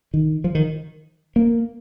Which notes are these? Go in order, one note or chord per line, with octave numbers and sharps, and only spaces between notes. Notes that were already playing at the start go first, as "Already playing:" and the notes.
D#3
F3
D#3
A#3